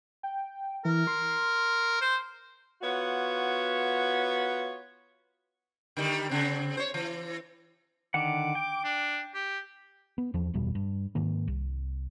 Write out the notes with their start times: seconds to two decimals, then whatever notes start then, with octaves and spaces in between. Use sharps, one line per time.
0.23 G5
0.85 E3 A#4
1.07 C6
2.01 C5
2.82 B3 F4 F#4 C#5
5.97 D3 D#3 G3
6.29 C#3 C4
6.77 C5 C#5
6.94 E3
8.14 D3 D#3 F#5 D6
8.55 G5
8.84 D4
9.34 G4
10.18 B3
10.34 E2 F3
10.54 F#1 E2 B2 G3
10.75 G2
11.15 G#2 D#3 A#3
11.48 C2